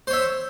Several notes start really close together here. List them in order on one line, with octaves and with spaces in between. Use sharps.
C5 C#5 E5